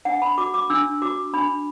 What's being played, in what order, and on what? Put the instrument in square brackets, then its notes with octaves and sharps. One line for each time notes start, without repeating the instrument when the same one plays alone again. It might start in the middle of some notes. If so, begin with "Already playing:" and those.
[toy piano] D4 F#5
B5
F#4 D6
D6
D4 E6
F#4 D6
D4 B5